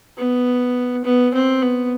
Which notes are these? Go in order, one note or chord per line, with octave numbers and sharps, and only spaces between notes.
B3
B3
C4
B3